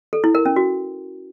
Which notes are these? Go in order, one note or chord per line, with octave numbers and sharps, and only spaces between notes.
A4
E4
A#4
C#4
F#4